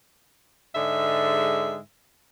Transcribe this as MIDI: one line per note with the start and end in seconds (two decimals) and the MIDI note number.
0.74 1.77 44
0.74 1.77 50
0.74 1.77 56
0.74 1.77 76